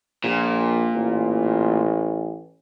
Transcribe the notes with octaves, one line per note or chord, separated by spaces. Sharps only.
A#1 A#2
A1